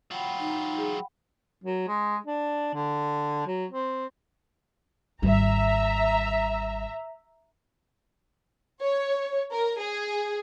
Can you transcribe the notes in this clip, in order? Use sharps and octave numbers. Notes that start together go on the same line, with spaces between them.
F#3 F4 F#5 G5 B5
D#4
G#4
F#3
G#3
D4
D3
F#3
C4
G#1 G3 E5 A#5
C#5
A#4
G#4